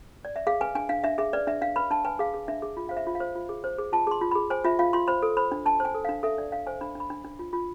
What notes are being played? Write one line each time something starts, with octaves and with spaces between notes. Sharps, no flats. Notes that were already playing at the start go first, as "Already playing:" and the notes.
D5
E5
G#4 F5
B4 G#5
D4 G#5
D4 F5
D4 E5
G#4 E5
B4 D5
D4 E5
D4 F5
B4 B5
D4 A5
B4 G#5
G#4 F5
G#4
D4 E5
G#4
F4
C5 F5
E5
F4
F5
C5
F4
G#4
C5
G#4
F4 A5
G#4 C6
F4
G#4 B5
C5 G#5
F4 E5
F4 F5
F4 C6
C5 B5
A4
C5 B5
D4
D4 A5
C5 G#5
A4
D4 F5
A4 E5
D4 D5
D4 F5
C5 G#5
D4 B5
D4 B5
D4
D4
F4
F4